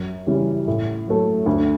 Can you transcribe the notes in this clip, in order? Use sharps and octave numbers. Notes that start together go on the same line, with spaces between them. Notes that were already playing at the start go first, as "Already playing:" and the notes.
Already playing: F#2
C#3 E3 G3 C#4
A2
F#3 A3
D2